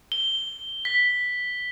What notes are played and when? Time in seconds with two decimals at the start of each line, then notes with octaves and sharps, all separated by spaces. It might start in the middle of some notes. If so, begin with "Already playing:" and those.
0.12 G7
0.85 B6